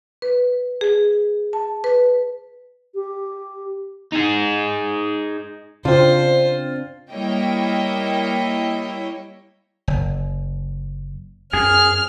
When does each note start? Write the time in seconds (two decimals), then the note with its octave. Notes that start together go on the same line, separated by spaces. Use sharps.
0.22 B4
0.81 G#4
1.53 A5
1.84 B4
2.95 G4
4.13 D#4 G#4
5.85 C#3 C4 D4 F4 C5
7.11 G3 A#3 E4 C#5 D#5 G5
9.88 F#1
11.53 F#2 G#4 F6